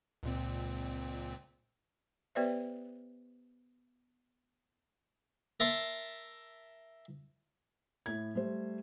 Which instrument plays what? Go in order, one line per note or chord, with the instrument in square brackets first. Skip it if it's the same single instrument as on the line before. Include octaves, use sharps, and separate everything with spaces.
[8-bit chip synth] C#2 A#2 C4
[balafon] B3 G4 B4 C5 D5 E5
[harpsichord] A#4 E5 A5 C6
[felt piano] A2 E4 G#6
G3 A3 C5